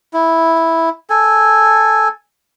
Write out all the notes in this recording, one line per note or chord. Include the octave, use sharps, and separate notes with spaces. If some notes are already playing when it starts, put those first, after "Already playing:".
E4
A4 G#5